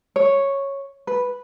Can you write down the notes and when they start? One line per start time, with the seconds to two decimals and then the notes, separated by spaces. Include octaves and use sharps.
0.16 C#5
1.07 B4